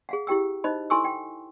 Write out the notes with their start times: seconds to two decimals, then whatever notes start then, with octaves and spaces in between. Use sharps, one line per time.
0.09 G#4 F5 F#5
0.27 E4 G4 G5 E6
0.64 D#4 C5 D#5 B5
0.90 E4 A4 G#5 C6 C#6 E6
1.04 G5